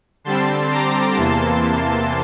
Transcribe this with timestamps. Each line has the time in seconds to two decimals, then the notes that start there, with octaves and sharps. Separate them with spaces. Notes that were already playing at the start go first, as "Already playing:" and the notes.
0.24 D3 G3 C4 A5 C6
0.70 A#5 D6
1.15 E2 C3 E3 A#3 A5 C6